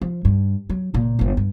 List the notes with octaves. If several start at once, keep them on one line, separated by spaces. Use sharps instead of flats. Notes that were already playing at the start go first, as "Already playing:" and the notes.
F3
G2
F#3
F#1 A#2
G1 D3
G2